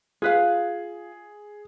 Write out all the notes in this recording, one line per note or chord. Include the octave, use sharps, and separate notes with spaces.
F4 G#4 B4 F5